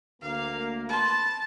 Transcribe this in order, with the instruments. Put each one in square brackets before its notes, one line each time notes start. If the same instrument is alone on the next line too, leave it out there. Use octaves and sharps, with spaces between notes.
[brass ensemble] D2 A#3 [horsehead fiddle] F5
[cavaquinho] B4 C6 [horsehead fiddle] A5